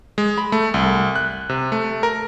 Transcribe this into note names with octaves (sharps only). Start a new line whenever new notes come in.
G#3
B5
A3
C2
F#6
C3
A3
A#4